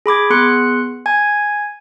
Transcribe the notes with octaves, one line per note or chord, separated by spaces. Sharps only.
G#4 B5 D6 G#6
B3 G#4 C6 F#6 C#7
G#5 G#6